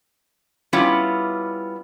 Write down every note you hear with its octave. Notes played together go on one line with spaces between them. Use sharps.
G3 B3 C#4 E4 F4